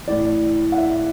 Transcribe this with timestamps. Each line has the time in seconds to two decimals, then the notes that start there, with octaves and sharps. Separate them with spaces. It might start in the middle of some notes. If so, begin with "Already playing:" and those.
0.07 A2 E3 D5
0.72 F#5
0.78 E5